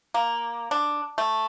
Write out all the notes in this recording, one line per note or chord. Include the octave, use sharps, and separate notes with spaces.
A#3
D4
A3